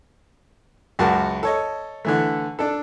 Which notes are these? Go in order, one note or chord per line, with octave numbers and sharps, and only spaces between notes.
C#2 F#2 F#4 A#4 A5
A4 C#5 D#5
D3 E3 A3
D4 A4